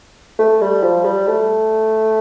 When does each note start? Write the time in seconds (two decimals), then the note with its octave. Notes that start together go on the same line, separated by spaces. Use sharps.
0.39 A3
0.61 G3
0.83 F3
1.04 G3
1.27 A3